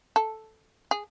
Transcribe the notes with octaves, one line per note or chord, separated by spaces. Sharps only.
A4
G#4